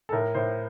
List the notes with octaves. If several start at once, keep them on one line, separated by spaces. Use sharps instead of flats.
A4
A2 A#4
A2 C5